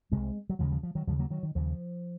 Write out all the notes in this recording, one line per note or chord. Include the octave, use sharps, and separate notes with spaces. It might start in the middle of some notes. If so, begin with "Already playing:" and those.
C2 C3 G#3 C4
F#3
D#2 C#3 F3 G#3
F3
F3
D#3 F#3
D#2 C#3 F3 G#3
F#3 A#3
D#3 F#3
D#3
D#2 C#3 F3